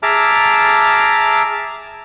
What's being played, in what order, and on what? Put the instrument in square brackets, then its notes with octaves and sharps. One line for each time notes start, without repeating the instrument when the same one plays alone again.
[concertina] G#4 E5 A5 A#5 D6 F6